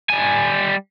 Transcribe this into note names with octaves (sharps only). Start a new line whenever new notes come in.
G3 G#5